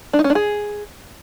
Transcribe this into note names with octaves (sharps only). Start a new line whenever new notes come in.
D4
D#4
C#4
D4
G#4